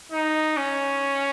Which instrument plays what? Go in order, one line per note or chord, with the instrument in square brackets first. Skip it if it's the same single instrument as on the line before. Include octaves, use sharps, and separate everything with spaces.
[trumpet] D#4
C#4